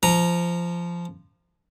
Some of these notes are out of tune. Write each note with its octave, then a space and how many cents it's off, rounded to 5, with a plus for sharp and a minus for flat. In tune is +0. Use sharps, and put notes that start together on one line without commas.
F3 -15 A#5 +0